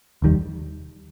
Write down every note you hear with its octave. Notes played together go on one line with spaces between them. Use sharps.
F1 D#2 D#3 G3